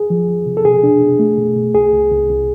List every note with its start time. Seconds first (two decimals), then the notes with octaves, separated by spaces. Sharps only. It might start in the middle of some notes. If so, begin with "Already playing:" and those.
Already playing: G#4
0.10 F3
0.29 F3
0.46 C3
0.57 A4
0.65 B2 G#4
0.83 D4
1.01 B2
1.19 A3
1.38 B2
1.56 B2
1.74 C2 G#4
1.92 C2
2.11 C2
2.29 C2